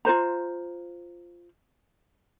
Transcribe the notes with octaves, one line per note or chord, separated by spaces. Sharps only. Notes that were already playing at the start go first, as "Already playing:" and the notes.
F4 B4 C5 A#5